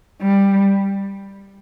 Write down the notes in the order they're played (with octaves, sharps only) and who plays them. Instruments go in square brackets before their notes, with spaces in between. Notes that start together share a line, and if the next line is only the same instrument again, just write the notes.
[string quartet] G3